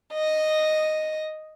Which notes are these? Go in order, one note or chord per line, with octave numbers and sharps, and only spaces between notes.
D#5